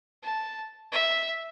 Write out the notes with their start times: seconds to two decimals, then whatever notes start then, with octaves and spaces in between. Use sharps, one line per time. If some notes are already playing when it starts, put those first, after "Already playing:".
0.24 A5
0.92 E5